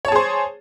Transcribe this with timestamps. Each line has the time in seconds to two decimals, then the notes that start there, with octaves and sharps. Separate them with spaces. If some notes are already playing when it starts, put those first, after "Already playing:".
0.05 C#5
0.08 A5
0.12 G#4
0.16 C5